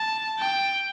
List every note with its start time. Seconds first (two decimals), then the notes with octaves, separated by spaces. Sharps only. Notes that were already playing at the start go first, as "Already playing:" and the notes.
Already playing: A5
0.39 G5